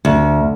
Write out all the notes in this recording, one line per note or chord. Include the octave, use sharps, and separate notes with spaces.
D2